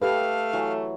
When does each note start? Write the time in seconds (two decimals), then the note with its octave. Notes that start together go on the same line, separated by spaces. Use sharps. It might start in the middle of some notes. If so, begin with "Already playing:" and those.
0.02 A3 G4 A4 B4 F5
0.53 E3 F#3